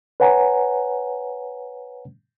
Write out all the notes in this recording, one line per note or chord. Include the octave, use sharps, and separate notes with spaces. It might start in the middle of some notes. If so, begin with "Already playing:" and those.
B4 C#5 F#5 G#5 A#5